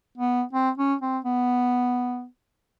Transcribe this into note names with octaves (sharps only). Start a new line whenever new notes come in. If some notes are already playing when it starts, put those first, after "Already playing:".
B3
C4
C#4
C4
B3